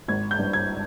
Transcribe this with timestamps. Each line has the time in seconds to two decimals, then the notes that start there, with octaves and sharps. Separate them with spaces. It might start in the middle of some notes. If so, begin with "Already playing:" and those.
0.08 G#1 G#6
0.31 G6
0.39 G2
0.53 G#6